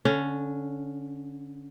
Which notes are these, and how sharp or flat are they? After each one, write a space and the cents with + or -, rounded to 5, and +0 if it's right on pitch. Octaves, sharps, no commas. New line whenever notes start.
D3 -20 C#4 +0